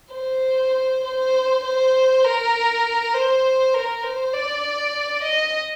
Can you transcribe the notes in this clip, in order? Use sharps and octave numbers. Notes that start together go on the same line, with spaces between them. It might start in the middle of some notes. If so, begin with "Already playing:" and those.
C5
C5
C5
A#4
C5
A#4
C5
D5
D#5